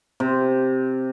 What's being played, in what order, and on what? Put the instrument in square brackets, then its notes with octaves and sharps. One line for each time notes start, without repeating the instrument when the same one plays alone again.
[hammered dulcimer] C3